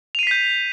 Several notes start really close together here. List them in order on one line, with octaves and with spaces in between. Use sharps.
F7 D#7 C7 B6 G6